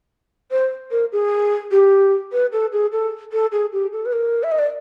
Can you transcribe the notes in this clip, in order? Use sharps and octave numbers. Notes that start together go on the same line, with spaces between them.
C5
A#4
G#4
G4
B4
A4
G#4
A4
A4
G#4
G4
A4
B4
A#4
E5
D#5
D5